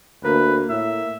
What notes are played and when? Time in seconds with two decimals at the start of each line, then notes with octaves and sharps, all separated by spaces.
0.24 D2 A#3 B4
0.70 A2 E5